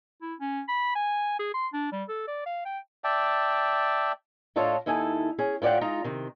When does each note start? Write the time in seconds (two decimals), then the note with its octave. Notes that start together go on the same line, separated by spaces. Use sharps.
0.22 E4
0.40 C#4
0.68 B5
0.95 G#5
1.39 G#4
1.54 C6
1.73 D4
1.92 G3
2.09 A4
2.28 D5
2.46 F5
2.65 G5
3.04 D5 E5 G5 A5
4.56 A2 D4 F4 A4 C#5 D#5
4.86 D#2 D#4 E4 A4 G#5
5.39 C#4 G#4
5.62 A2 F4 D5 F#5 G5
5.81 G#3 D#4 F4 A#5
6.04 C3 D#3